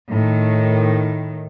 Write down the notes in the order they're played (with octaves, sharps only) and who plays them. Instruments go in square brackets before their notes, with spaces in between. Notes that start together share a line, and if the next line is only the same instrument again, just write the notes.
[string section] A2 D#3